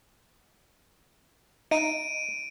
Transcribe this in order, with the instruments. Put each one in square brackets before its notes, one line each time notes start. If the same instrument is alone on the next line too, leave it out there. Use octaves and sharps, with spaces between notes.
[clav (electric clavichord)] D#4 [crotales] D7 D#7